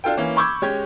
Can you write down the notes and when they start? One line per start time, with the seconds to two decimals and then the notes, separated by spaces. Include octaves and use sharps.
0.04 D4 F4 A4 G5
0.17 E3 A#3 C#4
0.36 B5 C#6 D6 E6 G6 G#6
0.62 G#3 C#4 G4 C#5 G#6